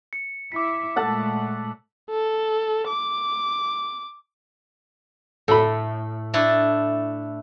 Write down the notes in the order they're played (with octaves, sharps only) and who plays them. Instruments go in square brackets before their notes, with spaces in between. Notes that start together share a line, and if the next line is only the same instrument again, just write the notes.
[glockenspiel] C#7
[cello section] E4 [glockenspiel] D6 B6
[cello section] A#2 G#3 A3 [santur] A4 F#5 A5
[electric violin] A4
D6
[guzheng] A2 [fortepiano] A4 B5
[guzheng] A3 D4 E4